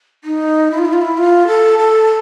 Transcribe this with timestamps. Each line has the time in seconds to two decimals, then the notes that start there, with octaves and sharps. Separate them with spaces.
0.24 D#4
0.71 E4
0.78 F4
0.85 E4
0.93 F4
1.02 E4
1.18 F4
1.47 A4
1.79 A4